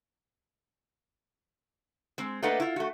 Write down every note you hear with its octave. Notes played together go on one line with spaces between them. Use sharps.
G#3 C4
A3 A#3 D4 B4 D#5 F#5
E4 F4
A3 F#4